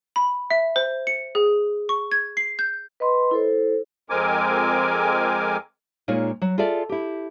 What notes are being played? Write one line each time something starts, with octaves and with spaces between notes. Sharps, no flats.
B5
E5
C5
C#7
G#4
C#6
G#6
C7
G6
B4 D#5 B5 C6
E4 A4 C5
F2 G#3 C4 A#4 G#5 D6
A#2 G#3 D#4 F4 C#5
F#3
F4 G#4 A4 D5 E5
E4 G4